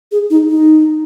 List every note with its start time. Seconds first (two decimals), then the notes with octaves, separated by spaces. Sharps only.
0.12 G#4
0.30 D#4
0.49 D#4